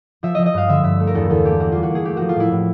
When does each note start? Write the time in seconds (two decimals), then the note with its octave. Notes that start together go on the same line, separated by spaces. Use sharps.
0.23 F3 E5
0.35 F3 D#5
0.46 D#5
0.54 G2 F5
0.68 D3 E5
0.83 G2 E5
1.00 A3
1.07 A#4
1.14 E2 A4
1.30 E2 A4
1.44 A#3 G4
1.60 A#3 F#4
1.72 G3 F4
1.83 F#4
1.91 A#3 G#4
2.05 A3 G4
2.17 F3 F#4
2.29 F4
2.36 A2 E4
2.52 A2